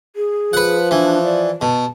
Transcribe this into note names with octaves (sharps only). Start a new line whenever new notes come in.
G#4
F3 B4 F#5
E3 D4
D5
B2 A5